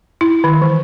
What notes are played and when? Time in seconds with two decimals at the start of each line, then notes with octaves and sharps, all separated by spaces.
0.21 E4
0.44 D#3
0.62 E3